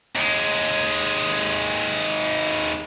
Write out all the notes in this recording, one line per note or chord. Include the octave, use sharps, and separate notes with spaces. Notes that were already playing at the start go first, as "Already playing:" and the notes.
D#2 G#3